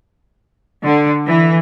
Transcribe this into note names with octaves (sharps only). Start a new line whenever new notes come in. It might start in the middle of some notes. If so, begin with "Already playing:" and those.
D3
E3